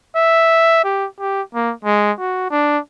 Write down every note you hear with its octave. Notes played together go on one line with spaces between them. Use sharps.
E5
G4
G4
A#3
G#3
F#4
D4